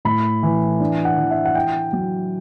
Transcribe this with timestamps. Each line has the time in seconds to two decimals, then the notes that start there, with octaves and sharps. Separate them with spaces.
0.05 A2 B5
0.43 E3
0.80 D4
1.05 F#5
1.18 E3
1.31 E5
1.45 F#5
1.55 E4 G5
1.93 F#3